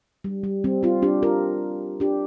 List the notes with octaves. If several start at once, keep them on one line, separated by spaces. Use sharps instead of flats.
G3
G3
G3 C4
C4 F4
D4 G4
F4 A#4
D4 G4